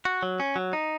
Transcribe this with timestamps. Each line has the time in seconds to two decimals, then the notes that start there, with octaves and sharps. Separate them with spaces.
0.05 F#4
0.23 F#3
0.40 C#4
0.56 F#3
0.73 D#4